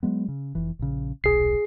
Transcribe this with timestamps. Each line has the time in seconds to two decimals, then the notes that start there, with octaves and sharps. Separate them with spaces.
0.03 F#3 G#3 B3
0.28 C#3
0.55 F1 E3
0.79 A#1 C#3
1.24 D#1 B1 G#4 C7